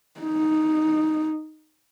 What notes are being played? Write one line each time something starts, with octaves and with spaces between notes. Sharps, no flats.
D#4